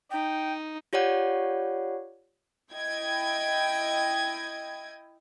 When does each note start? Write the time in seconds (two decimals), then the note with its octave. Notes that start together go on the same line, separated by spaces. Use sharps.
0.11 D#4 G5
0.93 F4 G4 C#5 D5 F#5
2.72 E4 D#5 G5 G#6